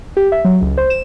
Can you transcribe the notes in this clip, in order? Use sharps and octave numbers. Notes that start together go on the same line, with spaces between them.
G4
E5
F#3
C#2
C5
E7